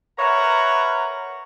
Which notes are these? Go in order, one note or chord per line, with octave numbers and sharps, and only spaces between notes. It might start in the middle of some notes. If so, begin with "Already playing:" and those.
A#4 B4 C#5 E5 F#5 A#5